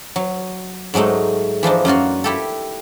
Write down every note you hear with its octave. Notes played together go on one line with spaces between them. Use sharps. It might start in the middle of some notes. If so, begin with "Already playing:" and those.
F#3
G#2 F#3 G#3 A3 D#4
E3 F3 D4 D#4
F#2 A#3 F4 F#4
E4 G4 A4